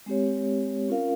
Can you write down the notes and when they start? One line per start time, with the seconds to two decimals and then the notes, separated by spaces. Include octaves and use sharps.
0.06 G#3 C4 G4 C#5
0.89 C#4 F4 A#4 F5